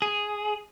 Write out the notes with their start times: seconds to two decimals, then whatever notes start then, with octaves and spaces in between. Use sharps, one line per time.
0.02 G#4